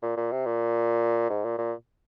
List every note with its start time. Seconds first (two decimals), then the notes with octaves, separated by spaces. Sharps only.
0.03 A#2
0.17 A#2
0.32 C3
0.46 A#2
1.30 G#2
1.44 A#2
1.58 A#2